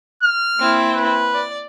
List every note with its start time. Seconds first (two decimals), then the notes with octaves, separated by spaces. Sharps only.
0.23 F6
0.59 A#3 C4 E4
0.95 B4
1.34 D5